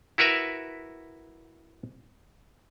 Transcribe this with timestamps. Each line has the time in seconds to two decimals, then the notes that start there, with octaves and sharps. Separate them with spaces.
0.18 E4 F#4 A#4 B4 E5